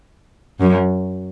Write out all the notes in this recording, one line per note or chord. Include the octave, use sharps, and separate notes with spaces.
F#2